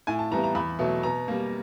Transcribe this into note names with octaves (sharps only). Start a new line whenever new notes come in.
A2 G#5
A5
E3 G3 B3 A#5
A#5
E2 B5
B2 F#3 A3
B2 A#5
G3 A#3